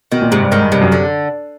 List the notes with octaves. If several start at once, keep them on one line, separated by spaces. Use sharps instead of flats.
B2 D#3
A#2
G#2 C3
G2
G#2 D#3
G2
G2 C3
F#2
D3